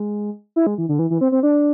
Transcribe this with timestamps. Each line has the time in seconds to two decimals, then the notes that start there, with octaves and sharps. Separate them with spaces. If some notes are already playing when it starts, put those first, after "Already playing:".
Already playing: G#3
0.56 E4
0.67 G#3
0.78 E3
0.89 D3
0.99 E3
1.10 E3
1.21 C4
1.32 C4
1.43 D4